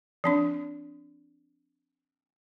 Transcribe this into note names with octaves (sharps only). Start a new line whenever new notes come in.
F3 C4 D4